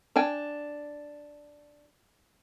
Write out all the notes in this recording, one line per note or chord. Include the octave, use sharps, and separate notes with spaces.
D4 G5 G#5